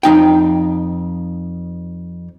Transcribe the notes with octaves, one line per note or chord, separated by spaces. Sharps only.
F2 D#4 G5